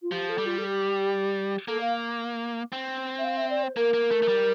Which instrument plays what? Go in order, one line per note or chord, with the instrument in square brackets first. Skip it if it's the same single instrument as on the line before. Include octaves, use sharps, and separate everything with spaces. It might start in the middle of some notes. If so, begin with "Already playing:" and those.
[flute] F4
[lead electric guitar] F3 [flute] G4
[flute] A4
[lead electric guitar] G3
[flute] F4
A4
G4
[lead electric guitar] A#3 [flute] A4
[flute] F5
[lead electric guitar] C4
[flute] E5
F5
E5
D5
C5
[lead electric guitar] A#3 [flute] A#4
[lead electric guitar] A#3
A3
A3
G3